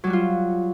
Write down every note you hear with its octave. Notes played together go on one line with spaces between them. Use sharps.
F#3 G3 F4 F#4